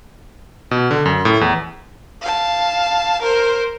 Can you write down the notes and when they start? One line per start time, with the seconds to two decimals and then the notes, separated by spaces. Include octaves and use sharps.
0.71 B2
0.91 D3
1.06 F#2
1.25 A2
1.41 E2
2.21 F5 A5
3.22 A#4 C5